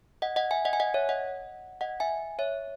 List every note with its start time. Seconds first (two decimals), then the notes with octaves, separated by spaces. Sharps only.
0.22 D#5 F#5
0.36 D#5 F#5
0.51 E5 G#5
0.65 D#5 F#5
0.73 G#5
0.80 D#5 F#5
0.94 C#5 E5
1.09 D#5 F#5
1.81 D#5 F#5
2.00 E5 G#5
2.39 C#5 E5